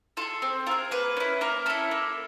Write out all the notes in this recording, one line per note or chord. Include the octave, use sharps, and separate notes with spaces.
F4 G#4 A4
C4
F4 G#4 A#4
A#3 B4
C#4 E4
A#3 A#4
C#4 E4 A4
A#3